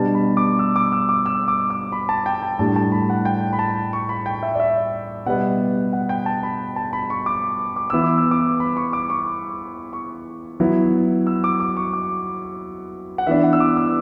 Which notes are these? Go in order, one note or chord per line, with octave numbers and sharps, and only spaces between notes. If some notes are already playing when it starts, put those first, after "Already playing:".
Already playing: B2 G3 D4 A5
B5
D6
E6
D6
E6
D6
E6
D6
D6
B5
A5
G5
A5
A2 G3 D4 A5
A5
B5
F#5
G5
B5
A5
C#6
B5
G5
E5
D5
E5
B2 G3 B3 F#5
F#5
G5
A5
B5
A5
B5
C#6
D6
D6
E3 B3 E4 E6
D6
E6
D6
B5
C#6
D6
C#6
C#6
F#3 B3 E4
E6
D6
D6
C#6
D6
F#5
E3 B3 D4 E5
F#5
E6
D6
E6